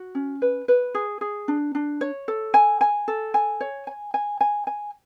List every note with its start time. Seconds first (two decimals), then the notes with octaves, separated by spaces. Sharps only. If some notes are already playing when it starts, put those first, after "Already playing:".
Already playing: F#4
0.15 C#4
0.42 B4
0.68 B4
0.95 G#4
1.21 G#4
1.48 D4
1.75 D4
2.01 C#5
2.28 A4
2.54 G#5
2.81 G#5
3.08 A4
3.34 G#5
3.61 C#5
3.87 G#5
4.14 G#5
4.41 G#5
4.67 G#5